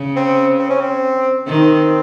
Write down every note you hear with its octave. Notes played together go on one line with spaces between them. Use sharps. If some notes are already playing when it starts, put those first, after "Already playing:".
Already playing: C#3
C4
C4
C#4
C4
D#3 C4